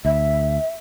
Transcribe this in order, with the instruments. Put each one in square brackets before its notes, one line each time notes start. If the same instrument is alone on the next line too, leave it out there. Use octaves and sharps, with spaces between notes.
[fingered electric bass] D2 [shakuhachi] E5